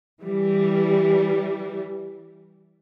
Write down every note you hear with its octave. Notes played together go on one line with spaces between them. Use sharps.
E3 G3